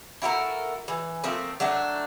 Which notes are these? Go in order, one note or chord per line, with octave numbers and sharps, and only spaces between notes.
E4 F#4 A4 A#4
E3
F3 A3 A#3 C4
F#3 A3 D4